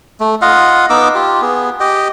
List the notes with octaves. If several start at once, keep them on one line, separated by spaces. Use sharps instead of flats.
A3
F4 D#5 F5 F#5
B3 D#4 D6 E6
F4 G4
B3 G#4
G4 D#5 G5